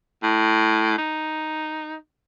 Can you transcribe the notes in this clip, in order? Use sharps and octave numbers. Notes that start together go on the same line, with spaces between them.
A2
D#4